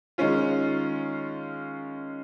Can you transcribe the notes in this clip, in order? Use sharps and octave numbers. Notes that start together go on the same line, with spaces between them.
D#3 G#3 C#4 F4